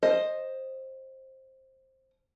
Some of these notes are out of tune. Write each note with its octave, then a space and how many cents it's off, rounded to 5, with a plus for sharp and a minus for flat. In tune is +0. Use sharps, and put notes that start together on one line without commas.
C5 +15 D#5 +0